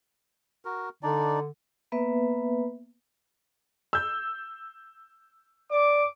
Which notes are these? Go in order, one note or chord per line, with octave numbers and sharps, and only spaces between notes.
F#4 A#4
D3 D4 D#4 D5
A#3 B3 B4 E5
E6 G6
D5 D6